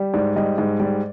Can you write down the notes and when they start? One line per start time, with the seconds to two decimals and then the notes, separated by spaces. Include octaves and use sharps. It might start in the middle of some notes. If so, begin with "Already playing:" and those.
Already playing: G3
0.13 G#2 D5
0.36 G3 D#5
0.58 G#2
0.80 G3 D5